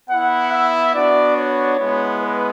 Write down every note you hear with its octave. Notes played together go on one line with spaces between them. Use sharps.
B3 E4 F#5
E5
B3 D4 F#4 D5
C#5
G#3 B3 E4
B4